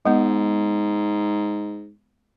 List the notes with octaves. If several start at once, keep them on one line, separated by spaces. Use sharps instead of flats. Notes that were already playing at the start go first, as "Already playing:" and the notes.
G#2 G#3 B3